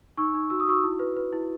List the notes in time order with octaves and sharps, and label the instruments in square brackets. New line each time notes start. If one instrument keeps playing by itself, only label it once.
[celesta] D#4 C#6 E6
D#4
F#4 E6
D#6
F#4 C#6 E6
E4
B4
B4
E4